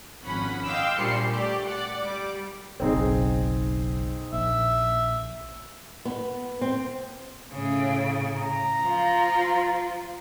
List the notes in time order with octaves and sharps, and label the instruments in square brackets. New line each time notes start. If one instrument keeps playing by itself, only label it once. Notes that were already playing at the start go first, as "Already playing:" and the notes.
[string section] G#1 F3 C#4 F#5 B5
D#5 F5 G5 C6 D6 E6
A#1 A#2 G3 C6 C7 C#7
A3 G4 D5
D5 F#5
G3 D6
[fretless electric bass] F#1 B1 [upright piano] C4 D#4 G#4
[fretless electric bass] A#1 [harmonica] E5
[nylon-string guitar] B3
C4
[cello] A2 C#3
[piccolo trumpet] A#5
[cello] F3 F4